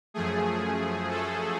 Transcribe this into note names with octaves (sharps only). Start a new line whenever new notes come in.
F#2 F3 A3 G#4
A4